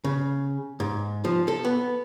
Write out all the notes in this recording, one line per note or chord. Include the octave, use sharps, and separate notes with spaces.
C#3
G#2
F3
A4
B3